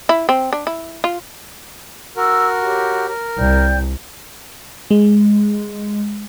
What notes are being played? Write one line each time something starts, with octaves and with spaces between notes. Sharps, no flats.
E4
C4
D4
E4
F4
F#4 A#4 E6
G4 C#5
A#4
C2 D5 G5 G6
G#3